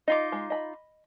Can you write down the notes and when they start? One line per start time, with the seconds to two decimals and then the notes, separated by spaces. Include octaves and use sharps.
0.08 D#4 F4 D#5 D6
0.32 G#3
0.50 D#5 B5